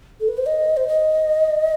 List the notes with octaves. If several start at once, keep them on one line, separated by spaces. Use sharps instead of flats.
A4
B4
C5
D#5
C5
D#5